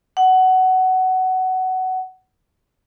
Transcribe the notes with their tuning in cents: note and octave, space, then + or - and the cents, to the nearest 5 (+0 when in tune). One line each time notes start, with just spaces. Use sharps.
F#5 +15